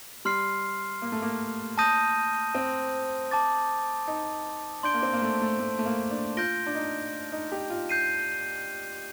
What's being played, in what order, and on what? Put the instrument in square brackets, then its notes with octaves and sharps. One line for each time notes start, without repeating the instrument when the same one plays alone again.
[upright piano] G3 [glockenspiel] C6 F6 C7
[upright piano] A#3
A3
A#3
[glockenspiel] A5 D#6 G6 A#6 D#7
[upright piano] C4
[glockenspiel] A5 D6 A6
[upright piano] D#4
[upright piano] D4 [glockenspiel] C6 G6 D7 G7
[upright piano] A#3
C4
A#3
A3
A3
A3
A3
A#3
D4
[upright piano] F4 [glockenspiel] G6 A#6 D7 G7
[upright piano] D4
D#4
D#4
G4
F4
[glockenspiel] G6 C7 D#7